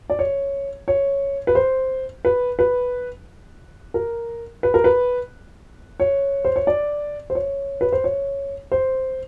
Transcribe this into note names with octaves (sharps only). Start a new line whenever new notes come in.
D5
C#5
C#5
B4
C5
B4
B4
A#4
B4
A#4
B4
C#5
C5
C#5
D5
C5
C#5
B4
C5
C#5
C5